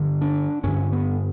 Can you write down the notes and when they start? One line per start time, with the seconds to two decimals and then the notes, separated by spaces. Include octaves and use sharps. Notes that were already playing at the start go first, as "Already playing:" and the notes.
Already playing: G2 D3
0.21 D4
0.64 G2 D3 C#4
0.92 B3